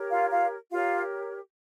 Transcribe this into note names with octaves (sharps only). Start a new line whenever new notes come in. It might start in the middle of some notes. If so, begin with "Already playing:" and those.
Already playing: G4 A#4 C#5
F4 F5
F4 F5
F4 G4 A#4 C#5 F5